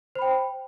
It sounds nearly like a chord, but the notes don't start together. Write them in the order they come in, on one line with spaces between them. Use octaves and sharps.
C5 B5 G5